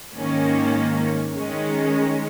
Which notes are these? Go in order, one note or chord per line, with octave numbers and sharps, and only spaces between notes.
G#2 D#3 A#3 C#4
D#3 G#3 C#4